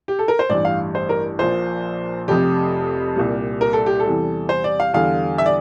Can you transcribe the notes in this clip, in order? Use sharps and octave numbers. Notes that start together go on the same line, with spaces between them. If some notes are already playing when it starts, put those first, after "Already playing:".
G4
A4
A#4
C5
A1 G2 E3 G3 D5
F5
C5
A#4
A#1 A#2 F3 C5
F1 F2 C3 G4
C2 A#2 G3
A#4
A4
G4
A4
E2 C3 E3 G3
C5
D5
F5
E2 D3 G3 F5
E5
D5